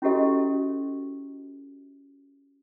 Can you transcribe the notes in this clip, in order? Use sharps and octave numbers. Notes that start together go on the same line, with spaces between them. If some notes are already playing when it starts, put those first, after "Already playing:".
C#4 E4 F#4 G4 A4 D#5